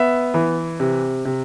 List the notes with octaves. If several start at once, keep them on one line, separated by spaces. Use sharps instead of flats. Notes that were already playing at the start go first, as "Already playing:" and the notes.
Already playing: B3 E5
E3
C3
C3